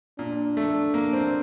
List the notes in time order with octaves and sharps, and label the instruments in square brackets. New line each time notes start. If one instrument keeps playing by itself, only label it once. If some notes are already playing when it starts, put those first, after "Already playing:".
[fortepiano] A#2 [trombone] D4
[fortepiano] A3
A#3
C4